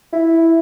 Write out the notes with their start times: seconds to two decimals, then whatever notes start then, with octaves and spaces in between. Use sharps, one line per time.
0.13 E4